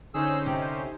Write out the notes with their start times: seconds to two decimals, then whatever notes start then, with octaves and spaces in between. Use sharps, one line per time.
0.14 D3 C#4 D#4 G#4 C5 E6
0.46 C3 G4